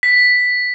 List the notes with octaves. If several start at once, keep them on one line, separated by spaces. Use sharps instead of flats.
B6